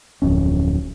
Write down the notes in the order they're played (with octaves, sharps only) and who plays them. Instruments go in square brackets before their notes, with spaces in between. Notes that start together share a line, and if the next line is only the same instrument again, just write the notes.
[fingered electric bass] D1 F2 C#4